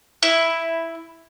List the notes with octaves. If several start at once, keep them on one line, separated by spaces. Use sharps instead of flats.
E4